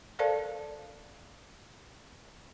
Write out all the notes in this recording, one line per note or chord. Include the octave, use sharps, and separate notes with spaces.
A4 A#4 C5 D5 F5 A5